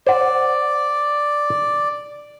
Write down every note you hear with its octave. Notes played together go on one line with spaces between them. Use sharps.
C5 D5 F#5